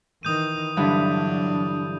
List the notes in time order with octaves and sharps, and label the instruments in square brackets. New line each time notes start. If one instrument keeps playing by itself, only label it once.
[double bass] D#3 E3 [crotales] D#6 G6 D#7
[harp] G2 D3 E3 [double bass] F#3 D4